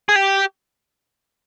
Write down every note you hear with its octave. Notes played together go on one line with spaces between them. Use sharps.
G#4
G4